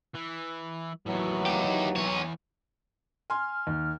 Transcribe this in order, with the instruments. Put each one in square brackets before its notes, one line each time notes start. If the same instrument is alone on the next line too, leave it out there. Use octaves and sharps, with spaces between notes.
[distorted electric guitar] E3
[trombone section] D#2 E3 F#3 [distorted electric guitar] A2 B3
[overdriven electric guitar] D#4 G4
[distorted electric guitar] E2 [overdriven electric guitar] B3 C#5
[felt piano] G#5 C6 [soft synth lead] F6
[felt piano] D#2